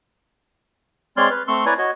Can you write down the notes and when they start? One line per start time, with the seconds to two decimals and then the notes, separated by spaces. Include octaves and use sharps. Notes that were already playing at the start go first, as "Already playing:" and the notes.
1.17 G#3 C4 C#5 D5 C6 F6
1.30 B4 F6
1.48 A3 C4 C6 C#6 E6
1.66 E4 B4 C#5 D5 G#5 A#5
1.78 F#4 C#5 D#5